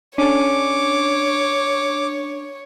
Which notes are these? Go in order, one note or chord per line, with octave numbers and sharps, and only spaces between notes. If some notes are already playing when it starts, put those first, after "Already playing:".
C#4 D4 A4 C#5 D6